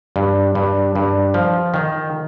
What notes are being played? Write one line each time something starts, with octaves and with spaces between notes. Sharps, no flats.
G2
G2
G2
F3
D#3